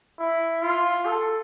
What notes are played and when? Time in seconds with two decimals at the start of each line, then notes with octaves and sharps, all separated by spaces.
0.19 E4
0.62 F4
1.05 A4